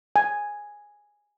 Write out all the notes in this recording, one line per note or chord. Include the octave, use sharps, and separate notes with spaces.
G#5